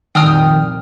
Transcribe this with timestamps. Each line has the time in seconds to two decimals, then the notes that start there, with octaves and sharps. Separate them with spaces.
0.15 C2 F2 A#2 D#3 G5 D#6 F6